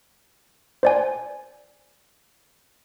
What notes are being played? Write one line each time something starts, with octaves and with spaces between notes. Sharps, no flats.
C5 D5 G#5